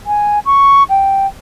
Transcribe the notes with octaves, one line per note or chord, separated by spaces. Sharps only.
G#5
C#6
G5